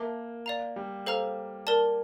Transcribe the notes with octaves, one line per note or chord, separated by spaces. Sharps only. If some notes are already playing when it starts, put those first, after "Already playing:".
Already playing: A#3 A#4 E5 A5 D6
D5 F5 A#5
G3
A4 C5 F5 A#5 F6
A#4 D5 A5